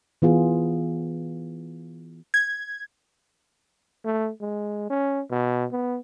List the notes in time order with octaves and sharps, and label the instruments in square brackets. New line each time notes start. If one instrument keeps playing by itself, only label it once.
[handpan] E3 B3 F4 G#4
[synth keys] G#6
[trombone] A3
G#3
C#4
B2
B3